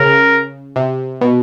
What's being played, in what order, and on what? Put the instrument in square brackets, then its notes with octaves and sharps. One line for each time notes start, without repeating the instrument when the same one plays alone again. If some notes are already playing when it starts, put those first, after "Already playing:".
Already playing: [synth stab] C#3 [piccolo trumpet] A#4
[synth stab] C3
B2